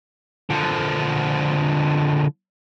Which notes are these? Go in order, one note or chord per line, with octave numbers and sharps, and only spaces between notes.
D3 F3